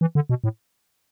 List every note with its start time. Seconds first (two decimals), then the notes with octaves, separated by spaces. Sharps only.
0.01 E3
0.15 D3
0.29 B2
0.44 A2